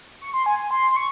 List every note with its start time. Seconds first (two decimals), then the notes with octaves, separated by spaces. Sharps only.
0.21 C#6
0.33 C6
0.46 G#5
0.59 G#5
0.71 C6
0.91 C6
0.96 C#6